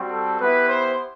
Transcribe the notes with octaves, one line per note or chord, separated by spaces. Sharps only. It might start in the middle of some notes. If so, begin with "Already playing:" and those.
Already playing: G3 C4 F#4
A4
B3 E4 G4 B4
C5